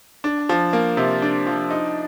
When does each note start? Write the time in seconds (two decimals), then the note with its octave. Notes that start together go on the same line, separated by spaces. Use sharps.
0.24 D4
0.49 F3
0.73 A#3
0.97 C3
1.22 D4
1.47 F3
1.70 D#4